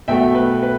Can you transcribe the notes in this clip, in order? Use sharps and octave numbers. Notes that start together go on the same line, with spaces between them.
B1 B2 A3 E5 G5
B4
B4